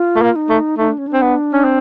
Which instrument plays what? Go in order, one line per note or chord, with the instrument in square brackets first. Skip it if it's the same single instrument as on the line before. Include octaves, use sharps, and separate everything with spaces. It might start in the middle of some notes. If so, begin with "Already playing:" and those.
Already playing: [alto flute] F4
[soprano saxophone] A3
A#3
[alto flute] D#4
[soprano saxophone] A3
[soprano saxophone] A3 [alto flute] D#4
[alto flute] D4
C#4
D4
[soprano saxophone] C4
B3
C#4
C4